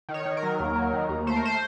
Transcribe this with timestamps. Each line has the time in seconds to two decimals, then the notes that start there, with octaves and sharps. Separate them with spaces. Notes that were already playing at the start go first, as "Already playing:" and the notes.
0.09 D#3
0.14 C#5
0.25 D#3
0.37 A#4
0.43 F#3
0.60 D#2
0.76 F#3
0.93 D#3
1.09 D#2
1.27 A3 C5
1.36 A#4
1.43 A3 C5